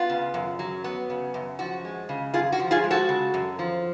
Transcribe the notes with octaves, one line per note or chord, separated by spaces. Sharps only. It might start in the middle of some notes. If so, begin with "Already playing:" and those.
Already playing: B3 F4
C#3
F#2
F#3
B3
C#3
F#2
F3 F#4
G#3
C#3
F#2 F4 G#4
F#4
F3
F4 G#4
G#3
F#4 A4
C#3
F#2
F3